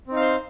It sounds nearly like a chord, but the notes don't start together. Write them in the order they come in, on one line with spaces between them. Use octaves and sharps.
C4 D#4 F5 C5